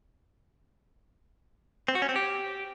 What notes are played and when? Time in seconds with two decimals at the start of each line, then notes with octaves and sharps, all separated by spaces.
1.88 C4
1.95 F#4
2.02 C#4
2.09 C4
2.16 G4